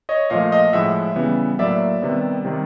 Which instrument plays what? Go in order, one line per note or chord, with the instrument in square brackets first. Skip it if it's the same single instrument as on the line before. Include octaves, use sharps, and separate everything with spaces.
[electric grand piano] C#5 D#5
A#2 F3 A3 D#5 F5
D#5 F5
A2 F3 G#3 E5 F#5
C#3 E3 G3 B3
A2 F#3 A#3 D5 E5
C3 D#3 G3 B3
C3 D#3 G3